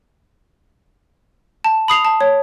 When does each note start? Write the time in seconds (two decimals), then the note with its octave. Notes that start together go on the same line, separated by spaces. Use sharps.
1.64 A5
1.88 B5 D#6 C7 F7
2.05 A5
2.21 C#5